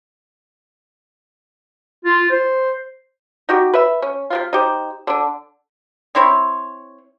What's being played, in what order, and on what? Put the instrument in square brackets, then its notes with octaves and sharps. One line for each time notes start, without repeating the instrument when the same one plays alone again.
[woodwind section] F4
C5
[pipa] D#4 F#4 G4
B4 E5
C#4
C3 F#3 F4
D#4 G4 C5
D3 D4
C4 E4 C5 C#5